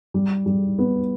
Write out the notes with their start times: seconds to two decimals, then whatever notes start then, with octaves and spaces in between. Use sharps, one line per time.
0.14 G3
0.46 G3
0.78 B3